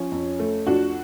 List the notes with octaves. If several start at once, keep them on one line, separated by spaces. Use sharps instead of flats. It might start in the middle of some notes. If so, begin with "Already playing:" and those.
Already playing: F3 C#4
F2
A3
F2 D4 F#4